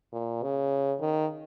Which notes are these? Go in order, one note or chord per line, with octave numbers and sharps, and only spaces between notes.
A#2
C#3
D#3